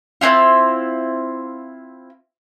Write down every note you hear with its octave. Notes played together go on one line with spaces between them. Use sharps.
C4 C#4 E4 F4